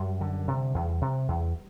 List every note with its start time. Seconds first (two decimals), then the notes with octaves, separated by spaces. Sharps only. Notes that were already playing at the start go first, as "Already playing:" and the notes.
Already playing: F#2 G3
0.21 D3
0.48 C3
0.75 E2
1.01 C3
1.28 E2